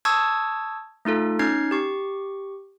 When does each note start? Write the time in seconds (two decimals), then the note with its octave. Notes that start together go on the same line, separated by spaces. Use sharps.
0.05 A5 C#6 D#6 E6 G#6
1.05 A3 D#4 F4 A4
1.39 C#4 D#4 F6 G#6 C7
1.71 G4 C#6